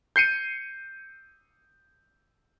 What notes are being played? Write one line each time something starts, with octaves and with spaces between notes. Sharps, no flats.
G6 C7 C#7 D#7